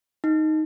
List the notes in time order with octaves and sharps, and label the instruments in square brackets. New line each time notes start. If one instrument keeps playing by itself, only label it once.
[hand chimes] D#4